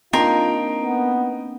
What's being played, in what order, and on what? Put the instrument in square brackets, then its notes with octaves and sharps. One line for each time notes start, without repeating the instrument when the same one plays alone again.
[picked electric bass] A#3 C4 D4 [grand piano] D#4 G5 [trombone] F4 [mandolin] A#4 C6
[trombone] B3